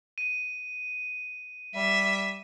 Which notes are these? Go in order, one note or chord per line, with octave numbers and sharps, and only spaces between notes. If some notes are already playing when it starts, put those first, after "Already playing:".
D#7
G3 E5